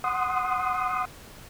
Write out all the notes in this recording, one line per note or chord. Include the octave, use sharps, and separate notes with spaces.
F#5 C6 D#6